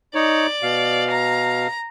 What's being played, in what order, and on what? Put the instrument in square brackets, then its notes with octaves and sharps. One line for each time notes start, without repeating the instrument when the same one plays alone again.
[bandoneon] D#4 C#5 [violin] D5
[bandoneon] B2 F5
[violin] A#5